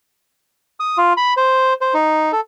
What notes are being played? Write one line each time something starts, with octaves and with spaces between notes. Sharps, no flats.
D#6
F4
B5
C5
C5
D#4
A4